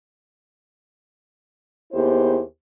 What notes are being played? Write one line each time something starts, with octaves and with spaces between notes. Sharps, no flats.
D#2 B3 E4 G4 G#4 C5